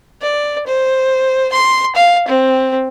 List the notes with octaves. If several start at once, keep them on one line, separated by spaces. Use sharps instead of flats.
D5
C5
C6
F5
C4